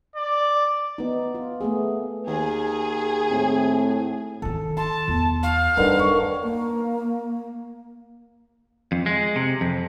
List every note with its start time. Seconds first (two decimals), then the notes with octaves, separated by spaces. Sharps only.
0.16 D5
0.98 B3 D#4
1.35 F4
1.61 A3 B3 G#4
2.27 D#2 G#4
3.31 A2 C4
4.42 D3 D#3 A4
4.77 A5 C6
5.08 E2
5.43 F5 C#6
5.77 G2 D3 D#3 G3 B4
5.99 C#5 C#6
6.44 A#3
8.92 F2
9.06 G#3
9.36 C3
9.61 F2